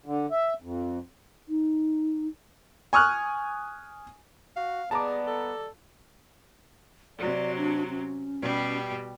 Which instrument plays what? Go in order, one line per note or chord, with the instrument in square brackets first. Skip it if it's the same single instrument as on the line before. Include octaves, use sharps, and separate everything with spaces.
[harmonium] D3
E5
F2
[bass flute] D#4
[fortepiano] G#5 C#6 D#6 F6 F#6
[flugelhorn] F#4 [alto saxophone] F5
[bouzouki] D#3 G3 A#3 [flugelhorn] B3 [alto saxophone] G#4 [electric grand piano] A5 A#5 D6
[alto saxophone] A4
[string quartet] C3 F#3 [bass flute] D5
[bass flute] D4
C#4
[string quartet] B2 G3 G4